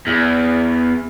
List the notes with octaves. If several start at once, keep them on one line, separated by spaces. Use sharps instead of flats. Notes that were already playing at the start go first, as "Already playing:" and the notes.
E2